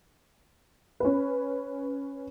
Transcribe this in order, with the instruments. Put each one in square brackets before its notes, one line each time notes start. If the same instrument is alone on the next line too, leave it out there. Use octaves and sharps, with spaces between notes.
[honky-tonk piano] C#4 B4